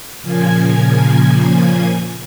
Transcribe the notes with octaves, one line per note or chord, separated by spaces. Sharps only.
A#2 C#3 F3 A#3 G#5 G#6